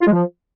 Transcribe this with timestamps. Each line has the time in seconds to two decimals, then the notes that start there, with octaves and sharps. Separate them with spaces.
0.01 F4
0.07 G#3
0.12 F3